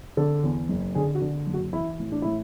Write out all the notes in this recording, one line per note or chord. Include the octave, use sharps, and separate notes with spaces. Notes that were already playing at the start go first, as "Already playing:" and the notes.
D3 A4
E2
F#1
D3 G#4
F#4
D3
F#1
F#4
E3 E4
A2
D4
A2 E4